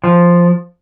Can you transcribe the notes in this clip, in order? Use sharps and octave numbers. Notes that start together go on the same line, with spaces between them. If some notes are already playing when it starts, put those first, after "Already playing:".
F3